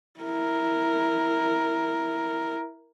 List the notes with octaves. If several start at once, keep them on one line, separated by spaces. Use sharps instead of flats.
E4 A#4